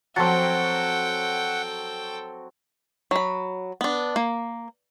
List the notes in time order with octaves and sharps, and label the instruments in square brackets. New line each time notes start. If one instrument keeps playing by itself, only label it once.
[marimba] F3 A5 A6 [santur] F#3 C4 [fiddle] A4 G5 [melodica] F#5
[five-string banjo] F#3 B5
B3 D4
A#3